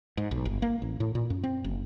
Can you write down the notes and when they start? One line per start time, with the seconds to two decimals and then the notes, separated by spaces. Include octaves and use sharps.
0.17 G#2
0.31 B1
0.45 G1
0.62 A#3
0.82 A1
1.00 A2
1.15 A#2
1.30 F#2
1.43 C4
1.64 F#1